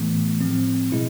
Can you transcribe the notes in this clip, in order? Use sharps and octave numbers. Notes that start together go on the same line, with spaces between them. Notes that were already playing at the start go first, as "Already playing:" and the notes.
Already playing: A2 E3 A3 B3
A2 F3 G#3 C4
B2 G#3 E4